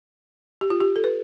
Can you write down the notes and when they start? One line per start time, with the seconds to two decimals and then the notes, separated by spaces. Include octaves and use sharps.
0.61 G4
0.70 F4
0.81 G4
0.96 A4
1.04 B4